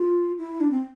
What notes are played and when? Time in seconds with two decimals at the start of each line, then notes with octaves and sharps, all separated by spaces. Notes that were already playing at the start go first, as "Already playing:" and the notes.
Already playing: F4
0.38 E4
0.61 D4
0.71 C4